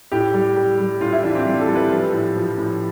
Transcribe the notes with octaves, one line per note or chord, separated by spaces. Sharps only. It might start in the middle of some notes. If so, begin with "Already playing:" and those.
A2 G4
G3
G3
G3
A2 F4
E4
E3 D4
C4
G3 D4
A4
G3
B4
F3
A2
F3
A2